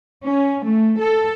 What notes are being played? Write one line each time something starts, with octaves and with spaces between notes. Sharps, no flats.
C#4
A3
A4